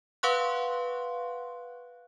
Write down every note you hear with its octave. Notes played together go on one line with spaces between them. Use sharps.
B4 F5 F#5 C6 C#6 F#6